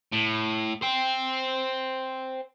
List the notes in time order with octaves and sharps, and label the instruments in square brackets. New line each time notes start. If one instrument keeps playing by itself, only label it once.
[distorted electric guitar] A2
C5 G5